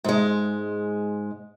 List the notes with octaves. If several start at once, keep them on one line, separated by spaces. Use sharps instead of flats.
G#2 G#3